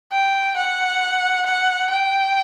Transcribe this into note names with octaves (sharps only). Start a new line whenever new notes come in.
G5
F#5
F#5
G5